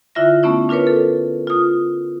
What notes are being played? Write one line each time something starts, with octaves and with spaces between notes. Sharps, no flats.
D3 E4 F4 E5 A#6
A3 B3 C#4 E4
D4 F4 A#4 B4 C#5
A4
F4 D#6